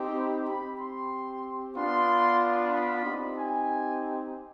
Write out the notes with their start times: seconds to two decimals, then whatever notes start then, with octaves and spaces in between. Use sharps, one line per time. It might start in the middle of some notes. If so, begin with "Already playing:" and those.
Already playing: C4 D#4 G4
0.16 B5
0.48 C4 G4 B5
0.80 C6
1.76 B3 D4 F4 C6
2.72 B5
3.04 C4 D#4 G4
3.36 G#5